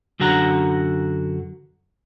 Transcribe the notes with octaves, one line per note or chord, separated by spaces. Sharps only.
F#2 D3 F#4 F#5 A#5